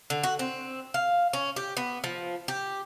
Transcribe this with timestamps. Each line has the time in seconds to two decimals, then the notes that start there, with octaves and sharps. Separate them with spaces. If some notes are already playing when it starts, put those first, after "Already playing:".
0.10 D3
0.23 F#4
0.39 C4
0.94 F5
1.33 C#4
1.56 G4
1.77 B3
2.04 F3
2.48 G4